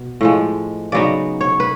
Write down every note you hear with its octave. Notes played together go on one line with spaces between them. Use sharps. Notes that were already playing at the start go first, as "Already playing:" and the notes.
Already playing: B2
A2 F3 G#3
C#3 F#3 B3 D#4 D5
C#5
B4